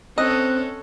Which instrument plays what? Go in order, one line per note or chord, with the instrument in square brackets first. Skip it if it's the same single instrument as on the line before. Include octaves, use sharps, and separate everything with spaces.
[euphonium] C4 [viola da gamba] C#4 A4 [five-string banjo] D#5 [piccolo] F#6